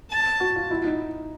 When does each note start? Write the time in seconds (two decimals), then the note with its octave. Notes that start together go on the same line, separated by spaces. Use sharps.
0.10 A5
0.40 F#4
0.56 F4
0.71 E4
0.85 D#4